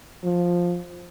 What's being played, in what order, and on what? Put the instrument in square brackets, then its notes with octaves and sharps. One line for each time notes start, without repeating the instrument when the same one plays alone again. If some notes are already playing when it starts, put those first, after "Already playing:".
[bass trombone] F3